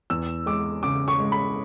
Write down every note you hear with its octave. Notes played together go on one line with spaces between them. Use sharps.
E2 E6
G#3 D6
C#3 D6
C#6
G#3
B5